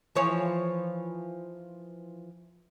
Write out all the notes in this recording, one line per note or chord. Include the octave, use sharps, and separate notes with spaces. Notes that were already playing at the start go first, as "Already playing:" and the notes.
E3 F3 C#5